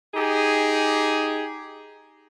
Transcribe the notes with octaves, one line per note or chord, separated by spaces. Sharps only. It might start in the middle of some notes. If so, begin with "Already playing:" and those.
D#4 G4 G#4